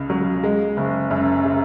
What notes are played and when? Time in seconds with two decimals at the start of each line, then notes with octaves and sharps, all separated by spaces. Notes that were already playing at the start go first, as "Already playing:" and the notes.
Already playing: C#2 C#3
0.10 F#3
0.43 G#3
0.77 F#1
1.10 F#2
1.45 C#3